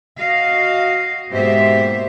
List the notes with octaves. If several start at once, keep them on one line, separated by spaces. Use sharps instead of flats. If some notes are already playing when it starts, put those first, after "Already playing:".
F#4 D#5 F5
G#2 B2 A#3 G4 C5 E5